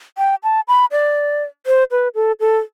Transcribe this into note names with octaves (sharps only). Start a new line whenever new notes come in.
G5
A5
B5
D5
C5
B4
A4
A4